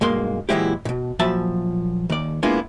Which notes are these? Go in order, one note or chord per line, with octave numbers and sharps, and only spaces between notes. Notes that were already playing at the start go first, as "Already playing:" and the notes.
B1 G2 G#3 A#3 C6
A#2 E3 F#3 G#3 E4 G4
G#2 B2
A#2 F3 F#3 E5 A5 B5
D#2 D5
G#3 A#3 B3 D4 E4 F4